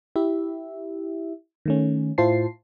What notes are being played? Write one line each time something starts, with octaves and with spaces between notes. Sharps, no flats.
E4 G4 E5
D#3 A3 C#4
A2 E4 F4 C5 A5 C7